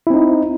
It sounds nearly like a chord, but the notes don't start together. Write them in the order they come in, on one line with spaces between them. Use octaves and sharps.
E4 C4 D#4